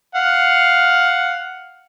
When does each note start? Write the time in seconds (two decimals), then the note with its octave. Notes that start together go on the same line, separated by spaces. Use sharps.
0.15 F5 F#5